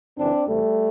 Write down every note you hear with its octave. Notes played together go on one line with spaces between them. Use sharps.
F#2 C#3 E3 C4 D4
D2 C3 E3 G3 A3